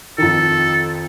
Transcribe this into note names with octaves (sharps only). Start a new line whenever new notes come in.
F2 D#3 A4